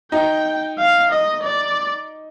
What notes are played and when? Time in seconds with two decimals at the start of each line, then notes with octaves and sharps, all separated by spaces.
0.12 D#4 G5
0.78 F5
1.11 D#5
1.43 D5